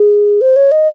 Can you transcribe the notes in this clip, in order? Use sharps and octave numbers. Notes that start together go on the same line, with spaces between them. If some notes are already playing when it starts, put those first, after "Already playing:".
Already playing: G#4
C5
C#5
D#5